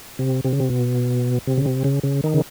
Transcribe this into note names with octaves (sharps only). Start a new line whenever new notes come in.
C3
C3
C#3
C3
B2
C3
C#3
C3
C#3
C#3
D#3
C#3